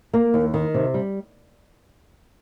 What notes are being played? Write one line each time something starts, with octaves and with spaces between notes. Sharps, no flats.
A#3
D#2
D#3
C3
G3